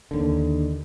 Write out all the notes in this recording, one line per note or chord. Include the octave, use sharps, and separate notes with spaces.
D#2 D3